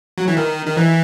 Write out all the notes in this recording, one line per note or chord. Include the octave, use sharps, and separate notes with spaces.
F#3
E3
D#3
D#3
E3